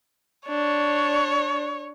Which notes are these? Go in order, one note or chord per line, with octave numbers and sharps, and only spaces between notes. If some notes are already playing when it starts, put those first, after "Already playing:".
D4 C#5